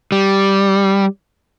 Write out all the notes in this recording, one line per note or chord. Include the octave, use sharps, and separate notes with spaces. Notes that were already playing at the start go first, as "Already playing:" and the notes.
G3